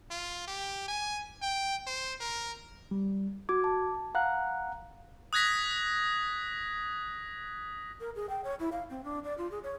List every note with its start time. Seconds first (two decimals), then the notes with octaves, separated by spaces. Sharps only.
0.10 F4
0.47 G4
0.88 G#5
1.42 G5
1.86 C5
2.20 A#4
2.91 G3
3.49 F#4 D6 G#6
3.64 A5
4.15 F5 F#5 A#5 F#6
5.33 D#6 F#6 G#6 A#6 B6
8.00 A#4
8.16 G#4
8.29 G5
8.44 C#5
8.60 E4
8.72 F5
8.90 C4
9.04 D4
9.24 D5
9.38 F4
9.51 G#4
9.63 C#5